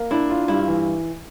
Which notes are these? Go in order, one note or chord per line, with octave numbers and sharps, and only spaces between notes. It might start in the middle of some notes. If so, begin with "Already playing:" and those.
Already playing: A#3
D4 E4
F4
G2 E4
E3